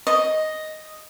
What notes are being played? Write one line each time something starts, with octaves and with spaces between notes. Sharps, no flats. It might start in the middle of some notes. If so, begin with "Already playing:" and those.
D#5